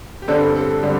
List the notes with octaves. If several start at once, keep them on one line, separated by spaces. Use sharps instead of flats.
G4
G2 D3 G3 C4 A4
A4
D3 G3 C4 G4